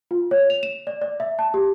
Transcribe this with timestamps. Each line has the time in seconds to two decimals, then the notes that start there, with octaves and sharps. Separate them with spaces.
0.11 F4
0.31 C#5
0.50 F7
0.63 E7
0.87 D5
1.02 D5
1.20 E5
1.39 A5
1.54 G4